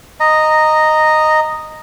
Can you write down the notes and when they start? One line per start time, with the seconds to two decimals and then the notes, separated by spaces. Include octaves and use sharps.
0.20 D#5 A#5